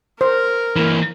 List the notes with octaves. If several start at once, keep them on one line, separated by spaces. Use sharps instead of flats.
A#4 C5
E3 A#3